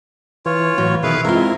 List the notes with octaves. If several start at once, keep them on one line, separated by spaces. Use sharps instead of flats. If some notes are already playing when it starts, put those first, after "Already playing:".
E3 F4 C#5
A2 E3 F#3 F#4
B2 D#3 E4 G#4 B4 F5
G#3 C4 E4 F4 A#4 E5